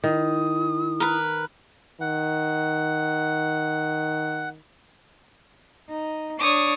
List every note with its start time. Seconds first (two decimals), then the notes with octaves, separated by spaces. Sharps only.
0.04 D#3 E4 D#6
1.00 A#4 B4
2.01 D#3 F#5
5.89 D#4
6.39 D4 C#5 D6 D#6